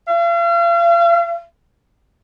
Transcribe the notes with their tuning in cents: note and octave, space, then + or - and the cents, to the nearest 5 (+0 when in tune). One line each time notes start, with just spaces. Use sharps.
F5 -40